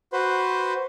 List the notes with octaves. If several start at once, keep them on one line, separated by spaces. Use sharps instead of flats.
F#4 B4 C5